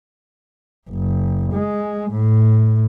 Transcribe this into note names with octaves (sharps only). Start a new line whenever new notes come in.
F#1
G#3
A2